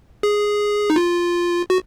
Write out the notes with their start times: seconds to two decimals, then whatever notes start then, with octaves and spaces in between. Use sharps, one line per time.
0.23 G#4
0.90 D#4
0.96 F4
1.70 F#4